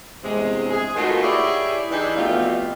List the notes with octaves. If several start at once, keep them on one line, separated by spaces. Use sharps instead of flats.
E2 G2 C3 G#3
G#4
A3 A#3 D#4 F4 F#4 B4
E4 G4 G#4 C#5 D5 E5
E3 D4 D#4 G4 G#4
F2 B2 A3 F4 G4 F5